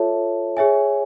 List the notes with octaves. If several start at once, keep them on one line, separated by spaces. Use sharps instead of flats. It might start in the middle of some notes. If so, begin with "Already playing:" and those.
Already playing: F4 A4 C#5 E5 A5
G#4 C#5 E5 G#5